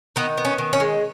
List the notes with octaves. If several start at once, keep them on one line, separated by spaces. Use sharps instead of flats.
D#3 B3 D#4
B3
C#4
D#3
C#4
G#3